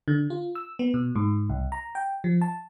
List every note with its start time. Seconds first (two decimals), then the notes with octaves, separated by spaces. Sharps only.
0.08 D3
0.30 F4
0.55 E6
0.79 B3
0.94 B2
1.16 G#2
1.49 C2
1.72 A#5
1.95 G5
2.24 F3
2.41 A5